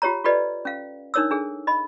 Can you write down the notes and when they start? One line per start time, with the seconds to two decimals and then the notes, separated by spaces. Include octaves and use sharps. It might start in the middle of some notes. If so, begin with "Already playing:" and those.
0.02 F4 G4 C#5 A#5
0.24 F4 G4 A4 B4 D5 D#5
0.65 C#4 F5
1.14 D4 D#4 A#4 C#5 D#6 E6
1.31 D4 G#4 A4
1.67 D#5 B5